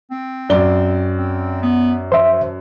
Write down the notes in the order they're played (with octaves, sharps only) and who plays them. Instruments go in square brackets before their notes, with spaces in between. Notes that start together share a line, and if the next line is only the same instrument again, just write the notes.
[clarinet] C4
[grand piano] F#2 D5 G7
[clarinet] C4
B3
[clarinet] F3 [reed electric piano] C5 E5